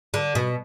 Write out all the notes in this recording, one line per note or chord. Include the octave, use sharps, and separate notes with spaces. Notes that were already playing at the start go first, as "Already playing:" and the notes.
D3
B2